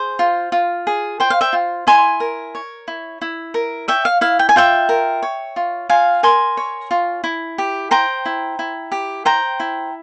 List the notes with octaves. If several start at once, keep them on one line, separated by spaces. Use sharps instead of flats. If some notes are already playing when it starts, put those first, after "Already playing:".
Already playing: G#4 C5
F4
F4
G#4
C5 G5
F5
E5 G5
F4
E4 G#5 C6
A#4
C#5
E4
E4
A#4
C#5 E5 G5
F5
E4 F5
G5
G#5
F4 E5 G5
A#4
C#5
F4
F4 F5 G#5
A#4 G#5 C6
C#5
F4
E4
G4
C5 G5 A#5
E4
E4
G4
C5 G5 A#5
E4